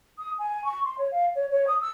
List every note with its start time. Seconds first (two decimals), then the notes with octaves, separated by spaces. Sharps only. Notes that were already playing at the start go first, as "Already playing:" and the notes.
0.17 D#6
0.38 G#5
0.64 C#6
0.84 C6
0.98 C#5
1.11 F5
1.35 C#5
1.50 C#5
1.67 D#6
1.81 E6